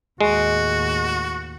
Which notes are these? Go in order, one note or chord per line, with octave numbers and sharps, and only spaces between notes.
D#2 A2 G#3 F#4